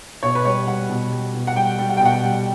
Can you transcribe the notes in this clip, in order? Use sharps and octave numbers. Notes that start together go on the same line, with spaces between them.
B2 C#5
B4
G3 C#5
G3 F#5
B2
G3
B2
F#5
G3 G5
G3
F#5
G5
B2 F#5
G3